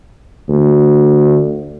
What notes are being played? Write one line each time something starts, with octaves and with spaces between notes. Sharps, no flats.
D2